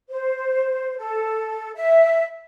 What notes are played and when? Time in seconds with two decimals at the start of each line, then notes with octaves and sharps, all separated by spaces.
0.09 C5
0.98 A4
1.75 E5